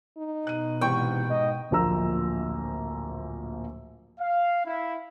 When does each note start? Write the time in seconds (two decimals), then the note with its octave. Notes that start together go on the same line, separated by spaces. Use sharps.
0.18 D#4
0.47 B2 F#6 D#7
0.81 G#2 C3 E3 G5 C#6
1.30 G#2 D#5
1.71 D1 A#1 F3 A#3 A#5 E6
4.19 F5
4.65 E4